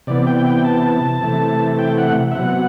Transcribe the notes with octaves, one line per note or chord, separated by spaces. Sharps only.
C3 E3 B3 D5
G5
G5
A5
C3 E3 A3
G5
F#5
E5
C3 F#3 B3 F#5